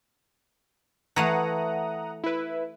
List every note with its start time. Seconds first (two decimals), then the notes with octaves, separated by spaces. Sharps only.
1.16 E3 A3 F5 F#5 A#5 D#6
2.24 E4 B4